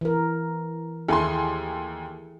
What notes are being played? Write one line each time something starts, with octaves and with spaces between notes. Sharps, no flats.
E3 A#4
D#2 E4 G#4 A4 G#5 C6